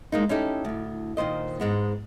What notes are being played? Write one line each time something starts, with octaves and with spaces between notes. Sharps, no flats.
G#3 A#3 D#4
C#4 D#4 E4 G4 A4
D2 A2
A#2 D#3 C5 D#5
G#2 G#3 B3